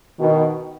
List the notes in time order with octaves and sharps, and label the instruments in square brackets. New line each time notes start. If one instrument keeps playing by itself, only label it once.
[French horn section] B2 D#3